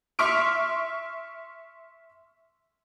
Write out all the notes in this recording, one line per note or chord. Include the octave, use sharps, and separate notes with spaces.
E5 C6 C#6 F6 D7